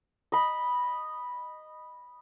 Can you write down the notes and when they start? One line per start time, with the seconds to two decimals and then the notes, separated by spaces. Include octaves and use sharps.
0.32 D#5 B5